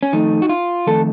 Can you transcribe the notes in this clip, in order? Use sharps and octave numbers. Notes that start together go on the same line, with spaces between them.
C#4
F2 D#3 A3 D#4
F#4
F4
F2 D#3 A3 A4